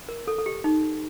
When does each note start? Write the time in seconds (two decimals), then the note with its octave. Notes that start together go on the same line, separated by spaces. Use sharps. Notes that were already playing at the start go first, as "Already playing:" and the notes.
0.09 A#4
0.27 A4
0.38 A4
0.46 G4
0.64 D#4